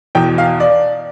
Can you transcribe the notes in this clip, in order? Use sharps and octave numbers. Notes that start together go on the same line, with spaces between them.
E2 B2 G5
F5
D5